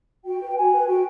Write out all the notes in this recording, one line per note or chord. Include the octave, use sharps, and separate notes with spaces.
F#4 G5
B4
F#4 G#5
B4
F#4 G5